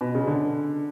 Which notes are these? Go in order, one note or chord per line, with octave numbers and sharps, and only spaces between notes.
B2
C#3
D3